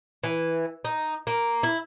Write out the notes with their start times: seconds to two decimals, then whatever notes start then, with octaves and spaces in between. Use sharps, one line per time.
0.24 E3
0.85 D#4
1.27 A#3
1.63 E4